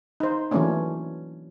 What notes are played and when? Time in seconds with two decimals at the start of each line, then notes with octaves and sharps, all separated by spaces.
0.20 D#4 C5
0.51 E3 F#3 A3 A#3 C#4 D4